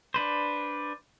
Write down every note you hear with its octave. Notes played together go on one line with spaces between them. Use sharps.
D4 B4 C5